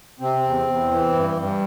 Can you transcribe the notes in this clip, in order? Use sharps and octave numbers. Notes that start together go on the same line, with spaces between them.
C3 C4
E2
E2
E3
G2
G2